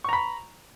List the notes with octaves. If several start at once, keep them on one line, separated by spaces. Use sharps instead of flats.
A#5 B5 C#6